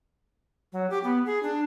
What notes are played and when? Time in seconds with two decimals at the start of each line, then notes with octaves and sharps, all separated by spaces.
0.72 F#3
0.90 G4
1.03 B3
1.26 G#4
1.43 D4